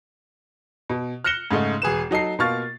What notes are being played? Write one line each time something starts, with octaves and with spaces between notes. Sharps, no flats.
B2
F6 F#6 A#6 C#7 E7 G7
G#2 C#3 A3 D#4
E1 G#4 B4 E7
F#3 D#4 A4 C7
B2 A#3 F4 C#6 F6 A6